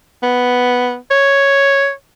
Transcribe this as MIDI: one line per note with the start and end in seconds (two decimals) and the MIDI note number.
0.23 0.96 59
1.11 1.90 73